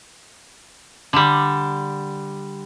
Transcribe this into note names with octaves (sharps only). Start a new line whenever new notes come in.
D3 G3